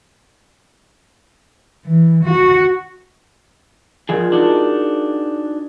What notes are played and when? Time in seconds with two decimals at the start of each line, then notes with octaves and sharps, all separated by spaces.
1.86 E3
2.25 F#4
4.09 A#2 F3 G#3 G#4
4.32 D4 D#4 F#4 G#4 A5